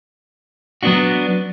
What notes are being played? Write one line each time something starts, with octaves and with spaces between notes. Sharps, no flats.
F#3 B3 D4 F#4